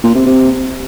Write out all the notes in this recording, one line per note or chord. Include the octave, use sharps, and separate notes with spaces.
A#2
C3
C3